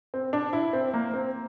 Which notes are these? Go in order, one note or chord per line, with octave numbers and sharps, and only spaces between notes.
C4
D4
E4
C4
A#3
C4